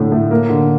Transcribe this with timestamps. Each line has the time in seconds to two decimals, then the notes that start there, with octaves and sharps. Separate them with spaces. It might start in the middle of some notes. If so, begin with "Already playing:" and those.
Already playing: A2 D3 A3
0.12 A2
0.31 A#3
0.49 D3